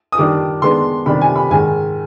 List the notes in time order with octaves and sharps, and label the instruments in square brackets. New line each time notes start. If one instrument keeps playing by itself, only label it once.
[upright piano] D#6
D#3 G3 D4 D6
D#3 G#3 B3 D4 C6
C3 D#3 G3 D4 B5
G#5
B5
G#2 D#3 G#3 G#5